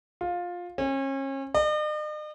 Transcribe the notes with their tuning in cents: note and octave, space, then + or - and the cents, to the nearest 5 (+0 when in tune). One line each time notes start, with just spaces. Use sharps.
F4 +15
C#4 -35
D#5 -45